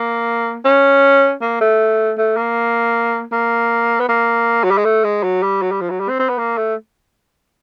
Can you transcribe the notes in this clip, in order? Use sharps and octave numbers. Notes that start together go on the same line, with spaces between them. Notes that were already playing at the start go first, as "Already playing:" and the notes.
Already playing: A#3
C#4
A#3
A3
A3
A#3
A#3
B3
A#3
F#3
G3
G#3
A3
G#3
F#3
G3
F#3
G3
F3
F#3
G3
C4
C4
B3
A#3
A3